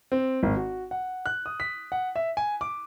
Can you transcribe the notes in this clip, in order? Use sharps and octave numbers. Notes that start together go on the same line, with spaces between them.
C4
G#1
F#4
F#5
F#6
D#6
B6
F#5
E5
G#5
D6